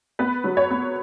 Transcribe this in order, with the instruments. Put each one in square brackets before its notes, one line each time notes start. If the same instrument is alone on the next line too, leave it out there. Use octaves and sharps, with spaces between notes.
[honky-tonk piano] B3 B4
F#3
C#5
B3